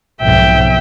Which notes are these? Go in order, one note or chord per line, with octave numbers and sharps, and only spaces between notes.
B1 F2 G#2 E5 G5